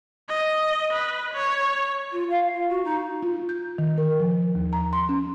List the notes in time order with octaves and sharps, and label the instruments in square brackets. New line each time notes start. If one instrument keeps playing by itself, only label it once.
[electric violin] D#5
B4
C#5
[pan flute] F4
F5
F4
F#4
D#4
[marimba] F4
G6
D#3
A#4
F3
D#2
A#5
C6
C#4